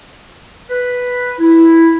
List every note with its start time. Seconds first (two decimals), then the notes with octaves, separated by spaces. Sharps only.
0.69 B4
1.39 E4